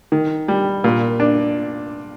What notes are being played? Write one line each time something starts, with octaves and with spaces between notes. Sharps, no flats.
D#3
G3
A#2
D4